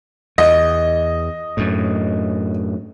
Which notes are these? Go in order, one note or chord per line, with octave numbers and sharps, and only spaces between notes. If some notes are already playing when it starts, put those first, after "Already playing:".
E2 D#5
F#2 A2